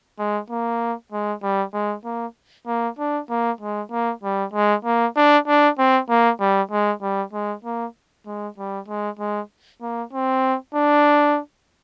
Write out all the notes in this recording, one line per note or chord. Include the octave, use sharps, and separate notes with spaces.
G#3
A#3
G#3
G3
G#3
A#3
A#3
D4
A#3
G#3
A#3
G3
G#3
A#3
D4
D4
C4
A#3
G3
G#3
G3
G#3
A#3
G#3
G3
G#3
G#3
A#3
C4
D4